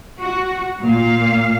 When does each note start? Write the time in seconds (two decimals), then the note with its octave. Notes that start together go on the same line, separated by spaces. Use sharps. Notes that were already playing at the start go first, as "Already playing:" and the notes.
0.20 F#4
0.82 A#2 F5